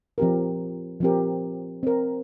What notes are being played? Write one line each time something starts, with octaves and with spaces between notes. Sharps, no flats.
F3 C4 G4 A#4
F3 C4 G4 A#4
C4 A#4